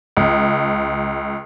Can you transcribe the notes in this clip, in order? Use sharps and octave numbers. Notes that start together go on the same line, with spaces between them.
C#2